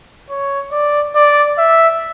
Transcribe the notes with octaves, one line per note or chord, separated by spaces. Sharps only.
C#5
D5
D5
E5